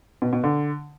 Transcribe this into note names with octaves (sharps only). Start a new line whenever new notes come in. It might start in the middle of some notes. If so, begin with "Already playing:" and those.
B2
B2
D3